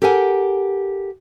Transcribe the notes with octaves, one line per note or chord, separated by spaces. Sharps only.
G4 A4 A#4 F#5 G#5